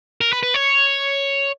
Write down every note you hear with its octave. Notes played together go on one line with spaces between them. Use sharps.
A#4
B4
B4
C#5